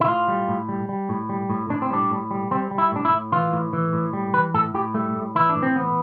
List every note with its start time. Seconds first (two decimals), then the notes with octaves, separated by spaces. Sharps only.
0.01 E4
0.08 A2 F4
0.28 G3
0.48 A2
0.69 G3
0.89 G3
1.09 A2
1.29 G3
1.49 A2
1.70 A2 D4
1.82 C4
1.90 G3 D4
2.11 A2
2.31 G3
2.51 G3 C4
2.71 G3
2.78 E4
2.92 A2 D4
3.05 E4
3.12 A2
3.32 E3 F4
3.53 A2
3.73 E3
3.93 A2
4.13 G3
4.34 E3 B4
4.54 A2 A4
4.74 A2 G4
4.94 G3 A3
5.15 A2
5.35 E3 E4
5.49 D4
5.55 A2
5.63 C4
5.76 E3 B3